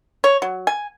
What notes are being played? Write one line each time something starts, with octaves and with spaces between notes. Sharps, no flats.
C#5
F#3
G#5